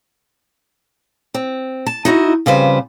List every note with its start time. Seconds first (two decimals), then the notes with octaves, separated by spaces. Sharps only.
1.34 C4
1.87 A5
2.05 D#4 E4 F#4 D#5
2.46 F2 C#3 G3 B4 C5